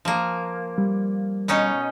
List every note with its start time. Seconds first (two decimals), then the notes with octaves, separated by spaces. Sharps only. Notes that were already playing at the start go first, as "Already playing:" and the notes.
0.05 F3 A#3
0.78 G3
1.48 B2 C#4 D#4